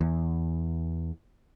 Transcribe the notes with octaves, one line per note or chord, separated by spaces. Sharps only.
E2